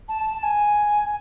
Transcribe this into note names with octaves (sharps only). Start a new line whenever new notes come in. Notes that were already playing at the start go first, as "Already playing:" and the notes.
A5
A5
A5
G#5